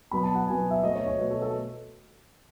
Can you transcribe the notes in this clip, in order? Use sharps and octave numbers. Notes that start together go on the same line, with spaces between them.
B2 F#3 B3 B5
A5
F#5
B2 F#3 B3 G#5
E5
B2 A3 D#5
C#5
C#5
B2 A3 B4
A4
A4